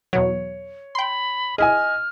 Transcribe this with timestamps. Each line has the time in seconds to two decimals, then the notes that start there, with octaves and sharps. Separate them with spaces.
0.13 E2 B2 F#3 C#5
0.95 G5 B5 C6
1.58 E4 G#4 D#5 G#5 F6